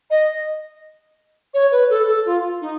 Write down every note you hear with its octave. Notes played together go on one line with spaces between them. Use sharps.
D#5
C#5
B4
A4
A4
F4
D#4